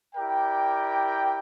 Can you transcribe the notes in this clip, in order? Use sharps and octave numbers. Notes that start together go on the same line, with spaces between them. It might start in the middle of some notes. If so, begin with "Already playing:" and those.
E4 G4 A#4 D5 G5